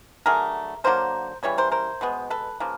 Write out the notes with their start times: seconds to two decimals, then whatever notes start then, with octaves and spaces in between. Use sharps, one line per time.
0.26 D3 F#3 A3 G#4 A#4
0.84 D3 F#3 A#3 A#4 C5
1.43 C#3 E3 G3 C#5
1.58 A#4 C5
1.72 A#4 C5
2.01 B2 G#3 B3
2.30 A4 B4
2.60 C#3 F3 A#3